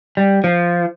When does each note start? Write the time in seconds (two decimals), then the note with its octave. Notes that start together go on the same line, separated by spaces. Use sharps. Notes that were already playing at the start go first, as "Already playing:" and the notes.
0.17 G3
0.44 F3